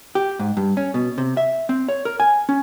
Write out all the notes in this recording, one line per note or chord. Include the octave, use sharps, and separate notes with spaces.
G4
G#2
G2
C#4
B2
C3
E5
C4
C#5
A#4
G#5
C#4